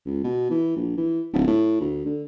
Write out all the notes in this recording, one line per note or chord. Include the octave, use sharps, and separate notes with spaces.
C#2
B2
E3
A#1
E3
D1
A2
D2
D3